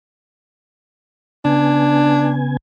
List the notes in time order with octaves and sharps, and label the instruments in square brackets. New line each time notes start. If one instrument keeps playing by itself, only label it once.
[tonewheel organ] C#3 B3 G#5 [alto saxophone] D4